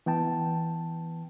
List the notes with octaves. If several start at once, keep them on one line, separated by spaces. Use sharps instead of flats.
E3 B3 G5 A5